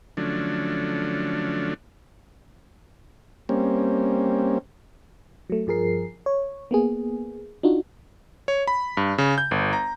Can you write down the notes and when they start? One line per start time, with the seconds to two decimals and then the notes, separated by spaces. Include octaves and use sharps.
0.17 D3 F3 F#3 A3 C#4 D4
3.49 G3 A#3 C4 C#4
5.50 F#3 A3
5.67 G2 F3 G#4 A#4 C7
6.26 C#5
6.71 A#3 B3 G#4
7.63 D4 D#4 F4 F#4
8.48 C#5
8.67 B5
8.97 G2
9.18 C#3
9.38 G6
9.51 G1
9.73 A#5